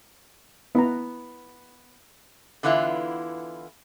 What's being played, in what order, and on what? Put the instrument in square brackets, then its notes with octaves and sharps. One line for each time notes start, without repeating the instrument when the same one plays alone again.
[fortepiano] B3 [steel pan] E4 B4 A#5
[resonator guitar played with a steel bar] D3 E3 B3 E4 F4